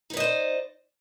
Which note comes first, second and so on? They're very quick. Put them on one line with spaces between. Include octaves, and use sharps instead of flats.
D#4 B4 D#5 C5 D5